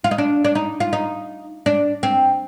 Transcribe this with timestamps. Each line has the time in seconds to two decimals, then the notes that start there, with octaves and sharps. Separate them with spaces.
0.04 F4
0.11 D#4
0.18 D4
0.45 D4
0.55 D#4
0.80 F4
0.93 D#4
1.66 D4
2.03 C4